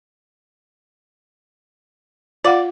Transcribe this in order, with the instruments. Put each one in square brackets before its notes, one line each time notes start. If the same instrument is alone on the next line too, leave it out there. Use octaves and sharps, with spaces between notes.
[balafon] F4 F5 F#5 [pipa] D5